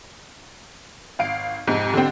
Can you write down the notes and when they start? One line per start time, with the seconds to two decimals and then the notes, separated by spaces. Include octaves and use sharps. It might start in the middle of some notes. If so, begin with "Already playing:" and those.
1.19 G#1 F5 D7
1.67 F2 G#2 C3
1.94 D3 G3 C4